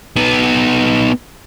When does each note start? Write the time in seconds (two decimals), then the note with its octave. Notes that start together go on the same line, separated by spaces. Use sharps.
0.17 B3 D#4